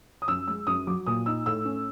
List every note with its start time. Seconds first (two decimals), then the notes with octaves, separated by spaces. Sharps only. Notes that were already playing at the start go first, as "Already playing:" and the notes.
0.22 D#6
0.28 F#2 E6
0.48 G#3 E6
0.67 F#2 D#6
0.87 F#3 D6
1.07 A#2 D#6
1.26 D#4 E6
1.46 A2 E6
1.65 C#4